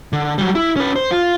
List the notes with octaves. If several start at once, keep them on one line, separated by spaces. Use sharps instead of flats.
D3
F#3 G3
E4
C#4 B4
C5
F4